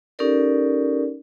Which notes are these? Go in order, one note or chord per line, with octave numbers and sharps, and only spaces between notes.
C#4 D#4 G4 A4 A#4 D5